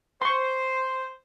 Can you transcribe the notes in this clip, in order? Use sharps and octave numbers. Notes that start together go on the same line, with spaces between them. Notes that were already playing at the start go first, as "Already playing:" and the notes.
C5 C6 C#6